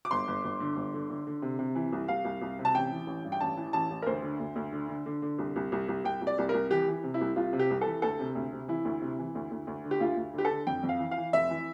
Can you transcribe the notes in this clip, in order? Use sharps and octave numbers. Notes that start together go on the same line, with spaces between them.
D6
G1 C6
G1
G1
D3
G1
D3
D3
D3
C3
C3
E3
C2
C2 F5
C2
C2
C3
A5
A1 G5
E3
A1
G2
G5
A1 A5
E3
A1 A5
A1
A#4
D2 C5
D3
D2
D2
D3
D3
D3
D3
C2
C2
C2
C2
C2 G5
C2
D5
C2
C2 A#4
E3 G4
E3
C3
E4
C2
C2 F4
C3
G4
C2
E3 A4
D2 A4
C3
D2
C3
E3 E4
D2
C3
E3
D2
D2
D2
D3
G4
D2 F4
D2
D3 G4
A4
D3
F2 G5
F2
F5
E3
F5
E3
F1 E5
E3